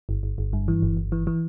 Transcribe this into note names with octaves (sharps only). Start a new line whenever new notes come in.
G1
G1
G1
G2
E3
G1
G1
E3
E3